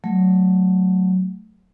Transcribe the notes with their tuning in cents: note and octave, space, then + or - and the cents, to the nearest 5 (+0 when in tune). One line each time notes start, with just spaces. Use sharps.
F#3 +0 A3 +0